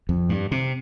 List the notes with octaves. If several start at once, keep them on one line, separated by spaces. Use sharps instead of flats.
F2
G2
C3